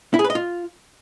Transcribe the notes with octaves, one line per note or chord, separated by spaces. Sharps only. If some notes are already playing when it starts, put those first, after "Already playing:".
E4
G#4
B4
D#5
F4